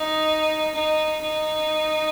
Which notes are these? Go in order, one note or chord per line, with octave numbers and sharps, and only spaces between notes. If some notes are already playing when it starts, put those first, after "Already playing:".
Already playing: D#4
D#4
D#4